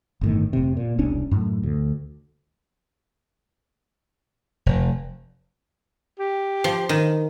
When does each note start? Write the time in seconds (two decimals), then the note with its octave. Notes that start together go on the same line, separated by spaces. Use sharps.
0.21 G1 A2 D#3
0.53 F1 C3
0.77 A#2
0.98 E1 C2 C#4 D4
1.31 F#2 A2
1.63 D2
4.66 F1
6.19 G4
6.64 F3
6.89 D#3